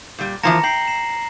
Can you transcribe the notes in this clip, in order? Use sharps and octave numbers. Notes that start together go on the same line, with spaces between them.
A#2 G3
E3 F3 A#3 A#5 A#6 C#7
G5 C7 F#7
C7 E7